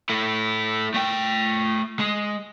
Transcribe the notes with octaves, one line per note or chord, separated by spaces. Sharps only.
A3 E4
A3 G5
G#3